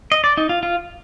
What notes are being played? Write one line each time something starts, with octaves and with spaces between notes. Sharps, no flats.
D#5
D5
D#4
F4
F4